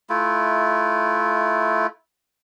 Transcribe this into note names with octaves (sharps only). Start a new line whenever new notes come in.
A3 E4 F4